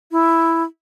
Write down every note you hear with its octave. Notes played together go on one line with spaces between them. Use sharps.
E4